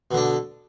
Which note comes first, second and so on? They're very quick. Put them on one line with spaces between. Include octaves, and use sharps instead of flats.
B2 D3 D4